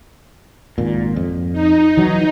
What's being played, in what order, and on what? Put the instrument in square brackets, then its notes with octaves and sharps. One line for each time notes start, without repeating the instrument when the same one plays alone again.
[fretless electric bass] G#1 A#2
F2
[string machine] D#4
[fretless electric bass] E3 F#3